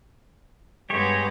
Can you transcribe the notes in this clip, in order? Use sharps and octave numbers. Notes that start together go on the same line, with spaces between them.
G2 G#3 B3 G4 C#5